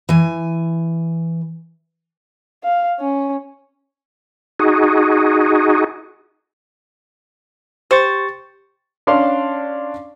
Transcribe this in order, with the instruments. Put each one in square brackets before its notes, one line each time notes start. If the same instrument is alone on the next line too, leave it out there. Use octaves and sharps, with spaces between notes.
[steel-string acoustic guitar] E3 G#5
[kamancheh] F5
C#4
[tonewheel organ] D#4 F#4 G#4
[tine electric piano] G4 C#6 A6 [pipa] C5
[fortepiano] C#4 D4 D5 F5 C6